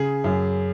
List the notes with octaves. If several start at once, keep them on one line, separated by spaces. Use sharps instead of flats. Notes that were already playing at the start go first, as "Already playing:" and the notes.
Already playing: C#3 G#4
F#2